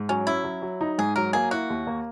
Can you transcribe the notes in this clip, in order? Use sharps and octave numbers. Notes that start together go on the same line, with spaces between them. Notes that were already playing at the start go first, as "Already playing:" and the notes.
Already playing: G#2
F#3 C#4
C#4 E4
F#3
F#3
D#4
G#2 G#4
F#3 A#4
A#3 G#4
E4 F#4
D#2
A#3